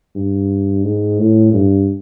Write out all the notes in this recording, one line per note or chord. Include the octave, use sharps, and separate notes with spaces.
G2
G#2
A2
G2